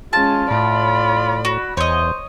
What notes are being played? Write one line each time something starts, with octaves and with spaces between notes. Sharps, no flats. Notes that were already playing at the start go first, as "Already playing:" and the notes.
G#3 C#4 F4 A5
A2 F4 D5 B5
F#4
E2 C5 C#5 D#5